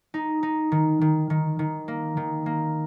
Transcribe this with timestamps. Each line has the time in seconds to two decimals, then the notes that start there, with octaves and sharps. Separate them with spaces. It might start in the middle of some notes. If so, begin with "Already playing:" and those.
0.14 D#4
0.43 D#4
0.72 D#3
1.01 D#3
1.30 D#3
1.59 D#3
1.88 A#3
2.17 D#3
2.46 A#3